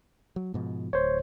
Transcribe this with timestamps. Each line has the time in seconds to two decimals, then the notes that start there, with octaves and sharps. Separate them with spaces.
0.36 F#3
0.54 G#2 B2 F3
0.93 D1 C5 C#5